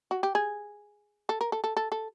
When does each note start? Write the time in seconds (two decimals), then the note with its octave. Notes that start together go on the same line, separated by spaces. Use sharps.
0.11 F#4
0.23 G4
0.35 G#4
1.29 A4
1.41 A#4
1.52 A4
1.64 A4
1.77 A4
1.92 A4